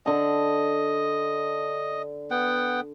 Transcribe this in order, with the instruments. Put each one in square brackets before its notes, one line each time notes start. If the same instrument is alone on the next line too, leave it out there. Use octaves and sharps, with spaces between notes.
[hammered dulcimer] D3 A5 [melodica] D#5
[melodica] B3 F#5 G5